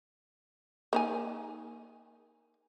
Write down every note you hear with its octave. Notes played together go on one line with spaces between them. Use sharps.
A#3 D#4 G#5